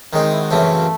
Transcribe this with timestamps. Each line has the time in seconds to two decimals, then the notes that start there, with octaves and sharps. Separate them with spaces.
0.13 D#3 G#3 C4 C#4
0.22 D#4
0.32 E4
0.41 F#4
0.50 F#2 C#3 E3 A3 C4 A4